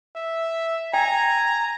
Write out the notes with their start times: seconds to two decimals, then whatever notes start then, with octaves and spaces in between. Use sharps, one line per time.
0.16 E5
0.93 G5 G#5 A#5